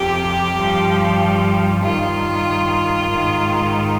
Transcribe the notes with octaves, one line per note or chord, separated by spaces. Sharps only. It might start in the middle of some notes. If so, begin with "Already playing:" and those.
Already playing: F2 C3 F3 G4
G2 F3
G2 D#3 F4
G#2 D#3